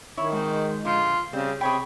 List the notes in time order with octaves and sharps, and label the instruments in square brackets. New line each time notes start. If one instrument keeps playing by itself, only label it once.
[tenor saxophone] D#3 [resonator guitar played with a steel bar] E4 [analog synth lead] C#5
[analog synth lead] G#3 [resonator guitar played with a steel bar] C4 F#4
[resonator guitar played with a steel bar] A#2 D3 F3 [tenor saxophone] F4
[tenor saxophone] C#3 [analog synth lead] G3 [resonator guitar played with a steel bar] C4
[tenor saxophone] C3 [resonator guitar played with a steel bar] G#4 C#5 G5 [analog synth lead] B5